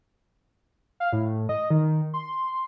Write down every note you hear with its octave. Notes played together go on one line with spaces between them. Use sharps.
F5
A2
D#5
D#3
C6